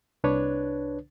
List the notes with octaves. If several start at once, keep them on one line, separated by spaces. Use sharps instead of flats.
C2 D4 B4 C#5